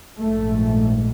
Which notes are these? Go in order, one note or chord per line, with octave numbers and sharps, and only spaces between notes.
A#1 G#2 A3